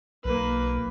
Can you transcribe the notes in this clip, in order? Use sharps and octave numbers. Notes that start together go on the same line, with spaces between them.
B1 A#3 B4